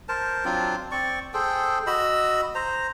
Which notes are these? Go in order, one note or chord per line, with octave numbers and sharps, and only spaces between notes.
A#4 C5 A5
F#3 C4 D4 F4
C4 D5 C#6
G#4 A4 C5 G5
F#4 D#5 B5 E6
C5 A#5